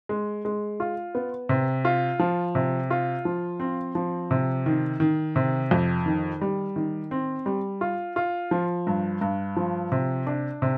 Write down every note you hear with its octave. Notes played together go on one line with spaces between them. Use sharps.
G#3
G#3
F4
B3
C3
F4
F3
C3
F4
F3
C4
F3
C3
D#3
D#3
C3
F2
D#3
G3
D#3
C4
G3
F4
F4
F3
G2
G2
F3
C3
D4
C3